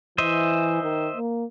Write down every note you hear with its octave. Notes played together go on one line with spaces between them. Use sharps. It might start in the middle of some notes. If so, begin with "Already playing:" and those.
E3 C5 D#5 E5
D#3
A#3